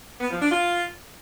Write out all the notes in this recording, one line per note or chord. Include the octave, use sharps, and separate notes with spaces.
B3
F3
D4
F4